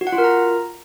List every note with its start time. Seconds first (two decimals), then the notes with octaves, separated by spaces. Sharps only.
0.01 F#4
0.07 F#5
0.12 F4
0.18 A#4
0.24 A#5